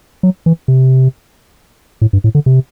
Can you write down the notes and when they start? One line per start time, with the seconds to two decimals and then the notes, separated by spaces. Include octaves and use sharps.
0.23 F#3
0.46 E3
0.68 C3
2.01 A2
2.13 G2
2.24 A2
2.35 D3
2.46 C3